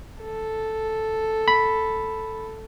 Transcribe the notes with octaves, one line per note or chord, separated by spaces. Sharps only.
A4
B5